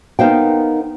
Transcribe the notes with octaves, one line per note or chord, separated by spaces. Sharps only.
B3 D#4 A#4 C5 F5 G5